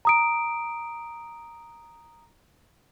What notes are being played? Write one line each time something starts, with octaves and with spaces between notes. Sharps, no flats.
A#5 D#6 D7